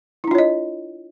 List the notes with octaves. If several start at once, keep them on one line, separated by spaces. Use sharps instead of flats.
D4 E4 F4 C#5 D#5